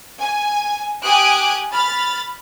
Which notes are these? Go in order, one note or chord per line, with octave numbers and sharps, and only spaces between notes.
G#5
G4 G#5 D#6 F#6 D7
B5 F6 A6